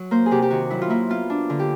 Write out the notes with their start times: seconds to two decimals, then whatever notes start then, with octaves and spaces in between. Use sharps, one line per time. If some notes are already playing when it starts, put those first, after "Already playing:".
Already playing: F#3
0.11 A#3 C5
0.26 G#4
0.31 C3 G4
0.42 G4
0.50 D#3 F#4
0.70 F#3 E4
0.82 F4
0.90 A#3 E4
1.10 B3 F4
1.30 D4
1.50 D3
1.59 G4